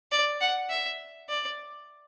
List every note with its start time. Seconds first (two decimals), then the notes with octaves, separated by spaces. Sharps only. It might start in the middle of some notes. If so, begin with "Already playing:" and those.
0.12 D5
0.41 F#5
0.70 E5
1.29 D5